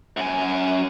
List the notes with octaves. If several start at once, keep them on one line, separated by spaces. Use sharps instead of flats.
F#2 G#5